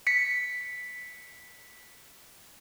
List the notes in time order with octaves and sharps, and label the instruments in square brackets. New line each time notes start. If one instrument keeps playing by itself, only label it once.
[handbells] B6 C#7